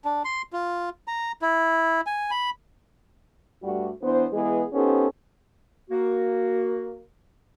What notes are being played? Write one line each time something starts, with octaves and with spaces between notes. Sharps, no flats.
D4
C6
F4
A#5
E4
G#5
B5
G2 G3 A3 F#4
E3 B3 D4 C5
E3 G#3 B3 G#4
B3 C#4 D#4 G4 A4 C5
A#3 F#4